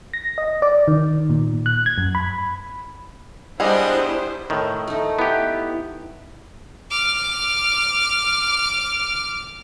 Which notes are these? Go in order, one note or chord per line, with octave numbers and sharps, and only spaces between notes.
A#6
D#5
D5
D#3
A#2
F#6
G#6
F#2
B5
G3 G#3 B3 D4 E4 G#4 C5 D#5
A2 D#3
A3 D#4
B3 E4 G4
D6 F6